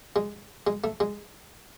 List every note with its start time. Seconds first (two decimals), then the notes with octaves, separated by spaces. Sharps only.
0.16 G#3
0.67 G#3
0.84 A3
1.00 G#3